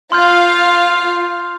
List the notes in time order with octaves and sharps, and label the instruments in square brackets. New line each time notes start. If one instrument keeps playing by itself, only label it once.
[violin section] F4 F5 [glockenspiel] C6 F6 G6